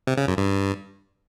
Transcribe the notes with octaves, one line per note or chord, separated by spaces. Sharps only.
C3
C#3
F#2
G2